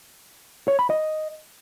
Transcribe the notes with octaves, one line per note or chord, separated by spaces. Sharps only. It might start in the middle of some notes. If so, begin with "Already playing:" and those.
C#5
B5
D#5